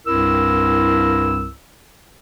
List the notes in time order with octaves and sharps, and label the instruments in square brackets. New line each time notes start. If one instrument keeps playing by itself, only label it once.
[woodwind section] C2 G2 C4 E4 A#4 E6